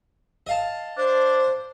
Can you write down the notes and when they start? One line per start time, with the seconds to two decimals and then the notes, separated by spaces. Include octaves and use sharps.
0.47 D#5 F5 A5
0.97 D4 C5